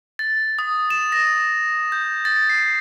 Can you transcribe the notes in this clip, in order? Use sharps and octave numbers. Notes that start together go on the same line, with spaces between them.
A6
D#6
E7
A#6
G6
A6
C7